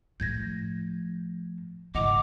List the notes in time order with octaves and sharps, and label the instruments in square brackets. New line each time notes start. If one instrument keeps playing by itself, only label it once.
[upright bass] A2 F3 [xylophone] G6 G#6 A#6
[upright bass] G#2 C#3 [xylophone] D#5 F#5 F7 [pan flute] D6